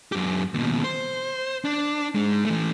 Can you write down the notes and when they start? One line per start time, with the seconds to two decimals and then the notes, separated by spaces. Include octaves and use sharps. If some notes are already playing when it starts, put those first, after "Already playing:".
0.12 F#2 G4
0.54 D#2 B2
0.84 C5
1.65 D4
2.15 G#2 G#3
2.45 E3 A3